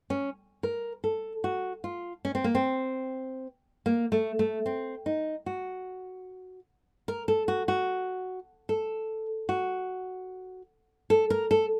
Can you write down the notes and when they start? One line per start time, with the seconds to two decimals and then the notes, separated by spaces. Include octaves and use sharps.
0.10 C#4
0.63 A#4
1.04 A4
1.44 F#4
1.84 F4
2.25 C#4
2.35 C4
2.44 A#3
2.55 C4
3.86 A#3
4.12 A3
4.39 A3
4.66 C4
5.06 D#4
5.46 F#4
7.08 A#4
7.28 A4
7.48 F#4
7.68 F#4
8.69 A4
9.49 F#4
11.10 A4
11.30 A#4
11.51 A4